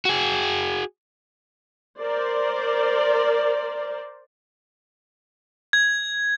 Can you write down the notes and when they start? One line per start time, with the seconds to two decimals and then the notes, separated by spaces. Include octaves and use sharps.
0.05 F#4 G#4
2.00 A#4 C5 D5
5.73 G#6